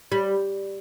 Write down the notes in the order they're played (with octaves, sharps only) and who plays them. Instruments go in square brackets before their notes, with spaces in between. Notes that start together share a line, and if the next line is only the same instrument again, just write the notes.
[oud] G3